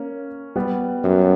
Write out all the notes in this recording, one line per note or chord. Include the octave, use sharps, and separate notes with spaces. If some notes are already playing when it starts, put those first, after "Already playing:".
Already playing: A#3 C#4
G3 B3
F#2